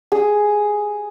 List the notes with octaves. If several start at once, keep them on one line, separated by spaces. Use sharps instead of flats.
G#4